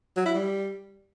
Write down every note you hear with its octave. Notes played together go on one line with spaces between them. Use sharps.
F#3
E4
G3